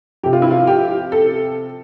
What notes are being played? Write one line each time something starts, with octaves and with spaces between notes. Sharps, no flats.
C3 F3 G4
F4
E4
F4
G4
A4